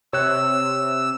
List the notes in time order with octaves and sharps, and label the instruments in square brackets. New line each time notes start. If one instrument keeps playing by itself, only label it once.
[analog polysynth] C3 [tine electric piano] C#5 F#6 [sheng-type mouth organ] E6